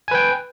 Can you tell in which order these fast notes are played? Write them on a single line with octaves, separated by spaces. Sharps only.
G#5 B4 G5